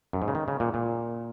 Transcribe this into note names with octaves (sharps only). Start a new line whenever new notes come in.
F#2
G#2
C#3
D#3
C#3
A#2
A#2